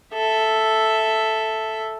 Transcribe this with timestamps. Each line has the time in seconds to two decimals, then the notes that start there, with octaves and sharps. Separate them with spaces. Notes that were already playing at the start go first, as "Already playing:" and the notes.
0.14 A4 E5